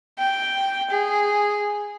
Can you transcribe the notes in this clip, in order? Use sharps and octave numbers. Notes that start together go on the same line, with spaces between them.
G5
G#4